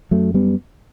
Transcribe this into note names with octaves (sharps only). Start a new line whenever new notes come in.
F#2 F#3 A3
G3 B3